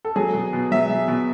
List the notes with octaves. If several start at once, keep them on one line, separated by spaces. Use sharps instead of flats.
A4
F#3 G#4
B2
B2
F#3 E5
B2
B2